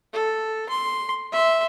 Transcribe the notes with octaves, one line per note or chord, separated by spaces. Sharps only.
A4
C6
E5 C6